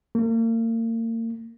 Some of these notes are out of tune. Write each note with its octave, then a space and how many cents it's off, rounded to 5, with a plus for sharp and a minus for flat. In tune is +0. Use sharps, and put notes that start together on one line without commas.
A#3 -40